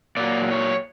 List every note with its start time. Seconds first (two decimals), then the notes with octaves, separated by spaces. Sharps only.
0.17 A#2 F#3 D5
0.51 C#5